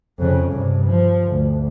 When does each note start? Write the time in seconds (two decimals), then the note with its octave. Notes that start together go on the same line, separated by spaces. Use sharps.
0.19 F2 C#3
0.52 G2 C3
0.87 F3
1.24 D2